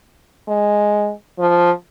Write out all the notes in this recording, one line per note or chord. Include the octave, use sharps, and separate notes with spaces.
G#3
F3